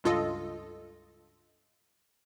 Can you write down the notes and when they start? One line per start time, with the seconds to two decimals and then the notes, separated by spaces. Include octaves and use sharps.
0.04 C#2 G2 F4 A4 D#5